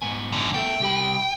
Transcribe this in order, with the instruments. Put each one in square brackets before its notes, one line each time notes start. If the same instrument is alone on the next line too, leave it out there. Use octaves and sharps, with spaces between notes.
[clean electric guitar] G#2 B3 G#5
[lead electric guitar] F#2 D3
[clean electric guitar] B3 A4 E5 [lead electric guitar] G5
[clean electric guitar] C2 G4 B5